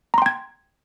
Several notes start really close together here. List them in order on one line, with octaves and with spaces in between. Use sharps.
A#5 C6 G5 G#6